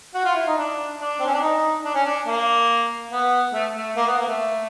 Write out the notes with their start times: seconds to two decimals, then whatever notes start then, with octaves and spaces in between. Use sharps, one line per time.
0.14 F#4
0.25 F4
0.35 E4
0.47 D#4
0.57 D4
0.99 D4
1.19 C4
1.26 C#4
1.34 D4
1.41 D#4
1.85 D4
1.95 C#4
2.06 D4
2.27 A#3
3.11 B3
3.54 A3
3.76 A3
3.96 A#3
4.07 B3
4.18 A#3
4.28 A3